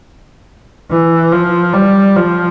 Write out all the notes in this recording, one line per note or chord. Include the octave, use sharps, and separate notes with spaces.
E3
F3
G3
F3